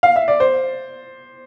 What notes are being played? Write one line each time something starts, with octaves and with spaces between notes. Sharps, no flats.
F5
E5
D5
C5